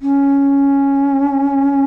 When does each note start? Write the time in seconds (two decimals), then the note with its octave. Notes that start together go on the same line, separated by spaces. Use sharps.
0.02 C#4